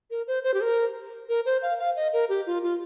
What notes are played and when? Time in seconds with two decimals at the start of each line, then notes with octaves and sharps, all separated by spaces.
0.11 A#4
0.27 C5
0.43 C5
0.54 G4
0.61 A#4
1.29 A#4
1.45 C5
1.62 F5
1.79 F5
1.96 D#5
2.13 A#4
2.29 G4
2.46 F4
2.63 F4